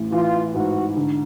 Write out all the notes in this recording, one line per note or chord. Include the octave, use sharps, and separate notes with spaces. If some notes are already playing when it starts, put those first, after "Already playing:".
Already playing: A1 E3
E3 F4
G#2 F#4
D3